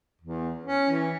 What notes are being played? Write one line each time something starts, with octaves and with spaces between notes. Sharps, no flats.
E2
C#4
E3